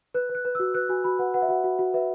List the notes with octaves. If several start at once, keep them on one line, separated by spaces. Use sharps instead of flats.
B4 F#6
B4
F#6
B4
F#4 E6
B4 F#6
F#4 G#5
F#4 B5
B4 F#5
B4 F#5
E5
F#4 F#5
F#4
F#4
B4 E5